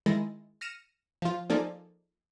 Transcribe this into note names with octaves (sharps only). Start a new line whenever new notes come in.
D#3 G#3 E4 A6 A#6
F6 A#6 C#7 D#7 E7
F3 F4
F3 A#3 D#4 G#4 A4 D5